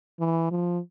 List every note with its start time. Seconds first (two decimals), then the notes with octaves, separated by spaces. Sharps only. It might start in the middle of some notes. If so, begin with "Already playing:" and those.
0.20 E3
0.51 F3